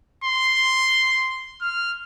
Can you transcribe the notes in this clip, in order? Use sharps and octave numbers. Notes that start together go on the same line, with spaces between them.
C6
F6